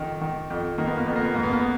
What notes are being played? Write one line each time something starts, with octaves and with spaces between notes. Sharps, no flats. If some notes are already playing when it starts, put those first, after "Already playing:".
Already playing: F2 D#3
D#3
F2
D#3 A#3
B3
A#3
F2 B3
A#3
B3
G#2 A#3
B3
A#3
B3